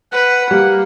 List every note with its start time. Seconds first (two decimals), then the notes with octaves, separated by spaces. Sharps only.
0.12 B4 F#5
0.51 G3 A#3